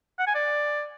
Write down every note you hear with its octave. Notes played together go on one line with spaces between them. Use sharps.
F#5
G#5
D5